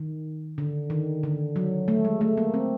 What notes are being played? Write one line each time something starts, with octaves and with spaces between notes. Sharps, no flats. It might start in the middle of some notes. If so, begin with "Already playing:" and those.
Already playing: D#3
D3
D#3
D3
F#3
A3
G#3
A3
A#3
C4